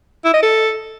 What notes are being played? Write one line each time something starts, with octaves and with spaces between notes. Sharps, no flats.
E4
D#5
A4